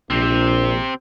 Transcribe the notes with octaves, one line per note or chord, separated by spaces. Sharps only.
A#1 C3 C4